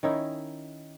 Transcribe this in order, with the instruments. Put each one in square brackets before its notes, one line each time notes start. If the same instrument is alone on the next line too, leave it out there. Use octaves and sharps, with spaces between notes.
[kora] D#3 C#4 D#4 E4